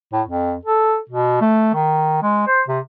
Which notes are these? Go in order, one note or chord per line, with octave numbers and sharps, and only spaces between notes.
A2
F2
A4
B2
A3
D#3
G#3
C5
C3